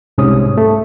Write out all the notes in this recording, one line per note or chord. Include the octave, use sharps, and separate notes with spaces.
C2 G#2 C3 C#4 D#6
A3